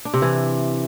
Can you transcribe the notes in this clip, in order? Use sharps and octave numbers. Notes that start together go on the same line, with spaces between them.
D4
C3
E3